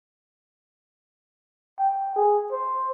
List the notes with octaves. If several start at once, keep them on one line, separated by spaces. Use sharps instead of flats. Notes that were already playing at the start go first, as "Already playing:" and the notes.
G5
G#4
C5